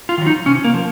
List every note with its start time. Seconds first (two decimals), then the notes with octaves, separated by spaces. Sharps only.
0.09 F4
0.18 D#3 F#3
0.26 D#4
0.46 C3 C#4
0.64 A#3
0.74 F3